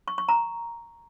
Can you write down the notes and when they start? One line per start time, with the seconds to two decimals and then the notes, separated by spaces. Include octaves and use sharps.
0.08 C#6
0.18 C#6
0.29 A#5